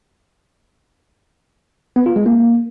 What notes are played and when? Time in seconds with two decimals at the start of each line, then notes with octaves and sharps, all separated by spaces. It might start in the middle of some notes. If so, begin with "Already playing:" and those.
1.96 B3
2.06 F4
2.16 G#3
2.26 A#3